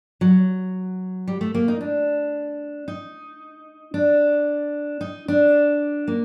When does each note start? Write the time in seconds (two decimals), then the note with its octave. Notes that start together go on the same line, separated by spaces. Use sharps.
0.21 F#3
1.28 G3
1.41 A3
1.55 A#3
1.68 D#4
1.81 D4
2.88 D#4
3.94 D4
5.01 D#4
5.28 D4
6.08 A#3